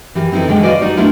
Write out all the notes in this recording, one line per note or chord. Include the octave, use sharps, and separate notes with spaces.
E3 G4 A#4
C4 D#4 E4 A4 B4
D3 D#3 G#3 F#5 G5
F#4 B4 D5 D#5 F5
G3 D#4 F#4
A3 B3 D4 E4 F4 A#4